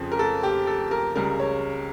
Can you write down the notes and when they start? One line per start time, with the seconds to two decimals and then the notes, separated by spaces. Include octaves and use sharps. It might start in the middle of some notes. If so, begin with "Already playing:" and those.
Already playing: F2 C#3 F3
0.12 A#4
0.19 A4
0.43 G4
0.67 A4
0.91 A#4
1.15 C#2 C#3 G3 A#4
1.40 C#5